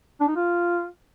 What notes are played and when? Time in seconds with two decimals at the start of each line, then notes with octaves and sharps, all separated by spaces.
0.20 D4
0.28 D#4
0.36 F4